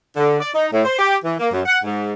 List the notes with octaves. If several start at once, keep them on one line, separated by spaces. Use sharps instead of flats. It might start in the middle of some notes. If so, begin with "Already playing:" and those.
D3
D5
D#4
A2
C5
G4
E3
A#3
F#2
F#5
G#2